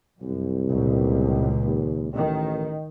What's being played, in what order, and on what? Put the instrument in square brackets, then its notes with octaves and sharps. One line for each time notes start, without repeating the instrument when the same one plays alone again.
[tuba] C2 [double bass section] F#2
[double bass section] C#2 A#2
[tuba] D#2
[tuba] A1 [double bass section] D#3